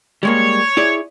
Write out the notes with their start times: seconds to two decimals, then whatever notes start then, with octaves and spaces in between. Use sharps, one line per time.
0.23 G3 G#3 A#3 C#5
0.77 E4 G#4 D5